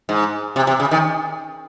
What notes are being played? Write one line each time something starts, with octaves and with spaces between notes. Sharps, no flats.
G#2
C3
C3
C#3
D#3